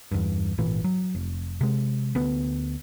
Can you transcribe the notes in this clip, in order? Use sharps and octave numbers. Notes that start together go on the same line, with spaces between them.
E2 G2
G#1 A#2 E3
F#3
F1
C3 G#3
D2 B3